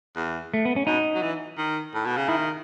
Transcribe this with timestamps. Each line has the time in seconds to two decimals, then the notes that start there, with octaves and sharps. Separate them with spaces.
0.17 E2
0.54 A3
0.65 B3
0.76 C#4
0.87 B2 D#4
1.14 F#3
1.22 E3
1.58 D#3
1.94 A2
2.06 B2
2.17 C#3
2.28 D#3 E4